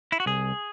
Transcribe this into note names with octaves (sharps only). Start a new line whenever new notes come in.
E4
F#4
C2 G#4